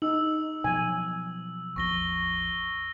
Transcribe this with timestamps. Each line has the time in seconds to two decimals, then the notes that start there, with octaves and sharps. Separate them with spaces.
0.02 D#4 E6 F#7
0.64 B2 F3 F#3 G#5
1.76 A1 E2 F3 C#6 A#6 G7